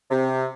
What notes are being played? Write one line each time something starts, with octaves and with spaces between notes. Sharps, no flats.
C3